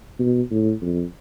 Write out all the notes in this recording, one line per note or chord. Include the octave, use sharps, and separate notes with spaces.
B2
A2
F2